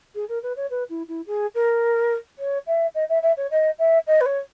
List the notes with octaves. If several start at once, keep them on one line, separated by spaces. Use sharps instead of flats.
G#4
A#4
B4
C#5
B4
E4
E4
G#4
A#4
C#5
E5
D#5
E5
E5
C#5
D#5
E5
D#5
B4
C#5